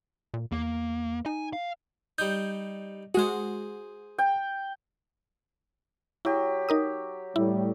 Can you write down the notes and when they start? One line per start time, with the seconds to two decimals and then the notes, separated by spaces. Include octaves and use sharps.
0.34 A#2
0.52 E2 A#3
1.26 D#4 G#5
1.53 F5
2.18 G3 D#4 G6
3.14 G#3 F#4 G#4 C5
4.18 G5
6.25 F#3 E4 G4
6.69 D#4 A#4 D#6
7.36 A2 G3 E4